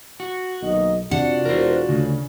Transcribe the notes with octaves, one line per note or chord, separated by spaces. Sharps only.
F#4
B1 D#3 A#3 D#5
C3 D4 F4 F#4 F#5
E1 A#4 C5
D2 C#3